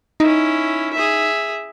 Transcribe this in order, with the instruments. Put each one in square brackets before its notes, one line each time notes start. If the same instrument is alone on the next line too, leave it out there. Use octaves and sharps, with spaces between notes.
[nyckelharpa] C#4 E4 [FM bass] D#4
[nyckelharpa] G#4 E5